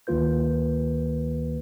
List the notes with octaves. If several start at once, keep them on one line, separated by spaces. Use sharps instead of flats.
D2 D#3 A#3 F4 B4 G6